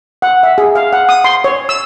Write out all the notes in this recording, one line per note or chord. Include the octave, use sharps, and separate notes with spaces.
F#5
E5
G#4
F5
F#5
D#6
C6
C#5
E6